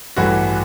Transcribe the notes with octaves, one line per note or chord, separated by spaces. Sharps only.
A1 G2 E3 A3 F#4